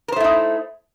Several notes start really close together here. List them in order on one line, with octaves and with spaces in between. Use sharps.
A#4 C5 A3 E4 D#4